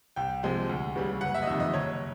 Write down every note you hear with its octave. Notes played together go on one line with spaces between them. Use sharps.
C2 G5
C3 F3 G#3
D2
C#3 E3 G3
F#1 F#5
E5
D#5
F2 C3 D#3 E5
D#5
F#1 C#5